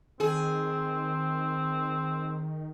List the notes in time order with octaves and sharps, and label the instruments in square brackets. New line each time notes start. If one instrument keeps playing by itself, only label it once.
[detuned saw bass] D#3 [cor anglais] C4 [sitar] G#4